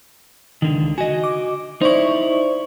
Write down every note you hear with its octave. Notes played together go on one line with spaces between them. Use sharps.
C#2 D3 D#3
F#4 D#5 G#5
D6
D#4 E4 C5 D5 C#6